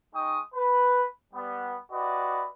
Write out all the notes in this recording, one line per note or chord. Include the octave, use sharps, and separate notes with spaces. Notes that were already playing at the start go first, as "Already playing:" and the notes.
G#3 D#4 G5 C#6 D#6
B4
G3 B3
E4 F#4 G4 B4 D5 D#5